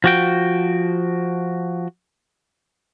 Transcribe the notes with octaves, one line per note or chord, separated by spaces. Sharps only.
F3 F#4 G5